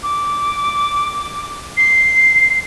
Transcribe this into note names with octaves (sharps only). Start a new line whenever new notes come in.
D6
C7